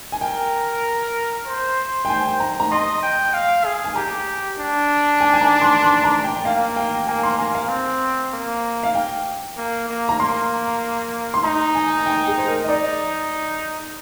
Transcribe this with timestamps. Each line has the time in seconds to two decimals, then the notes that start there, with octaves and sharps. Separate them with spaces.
0.12 G#5
0.21 A#4 G5
1.47 C5
2.05 G5
2.09 G#5
2.40 A#5
2.60 A#5
2.71 D#5 C6
3.03 G5
3.34 F5
3.65 G#4
3.84 G#5
3.96 G4 A#5
4.59 D4
5.21 G#5
5.34 G#5
5.41 A#5
5.62 C6
5.82 C6
6.04 A#5
6.24 G5
6.45 A#3 F5
6.76 G5
7.07 A#3 G#5
7.23 C6
7.39 A#3 G#5
7.55 F5
7.69 C4
8.33 A#3
8.83 F5
8.95 G5
9.58 A#3
9.89 A#3
10.09 A#5
10.20 A#3 C6
11.34 C6
11.44 D#4 A#5
11.75 G#5
11.98 G#5
12.06 G5
12.27 G#4
12.38 C5
12.48 A#4
12.64 D#5
12.69 D#4 D5